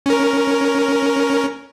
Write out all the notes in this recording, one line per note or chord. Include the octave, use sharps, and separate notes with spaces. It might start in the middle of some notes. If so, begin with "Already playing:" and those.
C#4 A#4